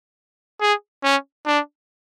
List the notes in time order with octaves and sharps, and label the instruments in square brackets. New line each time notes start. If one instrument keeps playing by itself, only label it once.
[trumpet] G#4
C#4
D4